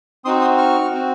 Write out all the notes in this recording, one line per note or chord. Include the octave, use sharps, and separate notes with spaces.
C4 D#4 F#4 C6 D#6
C6 D#6
C#6 F6
C4 F#4